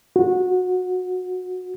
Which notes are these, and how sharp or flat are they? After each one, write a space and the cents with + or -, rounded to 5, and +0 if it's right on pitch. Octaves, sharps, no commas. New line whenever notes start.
F#4 -20